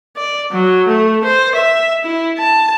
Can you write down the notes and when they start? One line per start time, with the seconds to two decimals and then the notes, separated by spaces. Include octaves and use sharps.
0.17 D5
0.52 F#3
0.88 A3
1.24 C5
1.55 E5
2.04 E4
2.38 A5